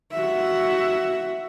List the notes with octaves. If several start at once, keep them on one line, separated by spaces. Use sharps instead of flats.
F#4 E5